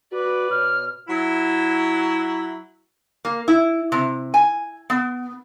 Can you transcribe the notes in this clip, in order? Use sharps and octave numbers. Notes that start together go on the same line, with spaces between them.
F#4 B4 D5
B2 C#5 F6
F#3 E4
A#3
E4
C3
G#5
B3